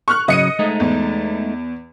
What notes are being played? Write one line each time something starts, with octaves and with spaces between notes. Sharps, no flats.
C#6 F6 F#6
C#3 F#3 D#5 C#7 D#7
G#3 A3 D#4
E2